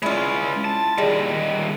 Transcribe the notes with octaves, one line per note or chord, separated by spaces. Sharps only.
G#3 C#4 E4 F4
A5
D#3 G3 G#3